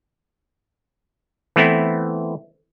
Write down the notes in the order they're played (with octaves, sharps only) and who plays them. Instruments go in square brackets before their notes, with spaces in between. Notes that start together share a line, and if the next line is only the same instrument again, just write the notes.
[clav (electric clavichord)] E3 A3 B3 C4 E4